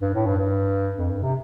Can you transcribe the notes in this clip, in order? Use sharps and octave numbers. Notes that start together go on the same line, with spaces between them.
G2
A2
G2
G2
F2
G2
C3